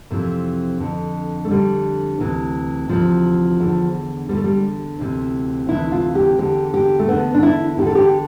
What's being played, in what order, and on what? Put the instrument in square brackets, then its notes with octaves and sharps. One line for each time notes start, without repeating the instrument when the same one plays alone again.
[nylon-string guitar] F2 C3 E3
F2 D3
A3
F2 D3 G3
D2 C3 E3
D2 C3 E3 F3
E2 D3
E2 D3 G3
A3
G3
D2 C3 E3
D2 C3 E3 E4
F4
G4
E2 D3 G4
G4
A3
E2 D3 B3
D4
E4
E2 D3 G4
A4
G4